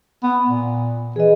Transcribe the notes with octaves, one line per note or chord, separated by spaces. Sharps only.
B3
A#2
E3 G#4 D#5